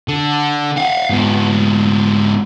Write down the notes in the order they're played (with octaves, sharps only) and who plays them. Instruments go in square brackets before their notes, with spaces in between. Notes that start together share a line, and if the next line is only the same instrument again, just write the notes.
[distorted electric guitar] D3
F5 F#5
G#2 B3